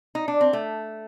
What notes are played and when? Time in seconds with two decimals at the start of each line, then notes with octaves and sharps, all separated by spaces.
0.15 D#4
0.28 D4
0.41 C4
0.53 A3